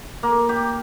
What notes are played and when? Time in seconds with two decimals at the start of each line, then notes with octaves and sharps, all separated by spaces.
0.23 A#3
0.49 G4